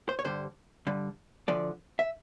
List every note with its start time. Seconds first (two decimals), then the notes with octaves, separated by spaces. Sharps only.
0.09 C5
0.19 C#5
0.24 G2 D3 G3 C5
0.87 G2 D3 G3
1.48 D2 D3 F3 D5
1.99 E5